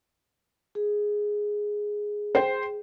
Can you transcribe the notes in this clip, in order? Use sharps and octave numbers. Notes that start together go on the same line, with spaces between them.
G#4
C5 G5